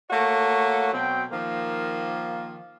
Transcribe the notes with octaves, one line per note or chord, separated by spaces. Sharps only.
A3 A#3 F#4 C#5
B2 F#3 C4 G5
D#3 F3 A#3